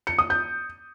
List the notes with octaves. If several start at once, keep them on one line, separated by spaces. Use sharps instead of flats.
C#7
D#6
G6